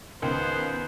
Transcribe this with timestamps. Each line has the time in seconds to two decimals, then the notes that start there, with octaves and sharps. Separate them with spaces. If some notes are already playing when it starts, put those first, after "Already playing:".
0.22 C#2 D#3 B3 C5